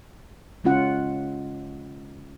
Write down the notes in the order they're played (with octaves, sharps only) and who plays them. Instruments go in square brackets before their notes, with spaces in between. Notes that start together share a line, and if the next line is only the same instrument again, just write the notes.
[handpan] C#3 G#3 C#4 F4 F#5